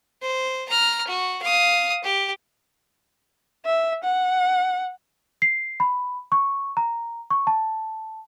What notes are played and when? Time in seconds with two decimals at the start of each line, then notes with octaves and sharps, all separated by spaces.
0.22 C5
0.69 A#5 F6
1.07 F#4
1.42 F5 D#6
2.04 G4
3.66 E5
4.04 F#5
5.42 C7
5.80 B5
6.32 C#6
6.77 A#5
7.30 C#6
7.47 A5